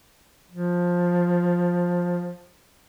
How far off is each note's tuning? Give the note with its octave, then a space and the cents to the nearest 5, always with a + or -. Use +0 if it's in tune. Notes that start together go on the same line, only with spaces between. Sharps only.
F3 +15